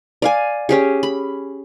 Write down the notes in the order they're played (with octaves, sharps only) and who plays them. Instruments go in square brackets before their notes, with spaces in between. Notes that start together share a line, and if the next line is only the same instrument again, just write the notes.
[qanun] D5 F5 G#5
C#4 G4 G#4
B5